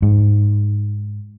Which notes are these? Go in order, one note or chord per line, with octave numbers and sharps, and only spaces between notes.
G#2